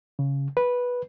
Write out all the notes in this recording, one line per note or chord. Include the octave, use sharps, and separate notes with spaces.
C#3
B4